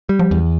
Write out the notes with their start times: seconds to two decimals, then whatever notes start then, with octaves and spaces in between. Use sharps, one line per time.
0.09 G3
0.19 F3
0.31 E2